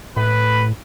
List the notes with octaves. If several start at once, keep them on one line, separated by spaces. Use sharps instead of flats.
A2 B4